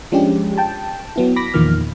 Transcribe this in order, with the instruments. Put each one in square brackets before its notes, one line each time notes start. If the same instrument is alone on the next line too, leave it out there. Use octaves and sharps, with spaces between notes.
[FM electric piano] F3 G#3 C#4 D4 G4
G5 A5
F#3 B3 E4
B5 D6 A#6 B6
E2 A#2 D#3 F3 A#3 F6